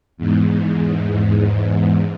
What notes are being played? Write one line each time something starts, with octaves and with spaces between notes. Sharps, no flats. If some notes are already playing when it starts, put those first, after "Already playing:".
E2 G#2